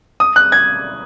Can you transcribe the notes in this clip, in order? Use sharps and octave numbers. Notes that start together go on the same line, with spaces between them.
D#6
F#6
G#6